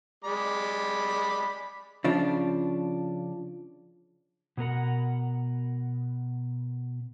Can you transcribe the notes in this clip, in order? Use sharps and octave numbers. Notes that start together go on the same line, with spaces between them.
G#3 D5 B5
C#3 F3 D4
B2 B3 A#4 F#5